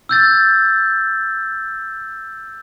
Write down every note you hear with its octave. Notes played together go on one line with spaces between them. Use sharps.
E6 G6 A6